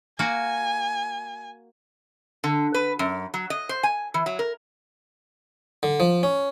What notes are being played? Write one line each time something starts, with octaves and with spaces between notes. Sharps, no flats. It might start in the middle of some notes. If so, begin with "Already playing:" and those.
A#3 F#4 G#5
D3
B4
F#2
F#3
D#5
C5
G#5
E3
F#3
A#4
D3
F3
C#4